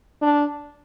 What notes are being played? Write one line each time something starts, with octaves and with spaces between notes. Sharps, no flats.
D4